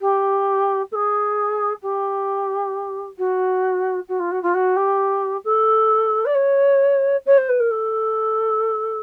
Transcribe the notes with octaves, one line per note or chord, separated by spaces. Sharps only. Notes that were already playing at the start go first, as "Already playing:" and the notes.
G4
A4
G#4
G4
F#4
F#4
F4
F#4
F4
F#4
G4
A4
D5
C#5
C#5
C5
B4
A#4
A4